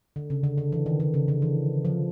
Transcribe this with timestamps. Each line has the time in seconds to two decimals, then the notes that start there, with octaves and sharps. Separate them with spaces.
0.16 D3
0.30 C#3
0.44 D3
0.58 D3
0.72 E3
0.86 D#3
1.00 D3
1.14 C#3
1.28 D3
1.42 E3
1.85 F3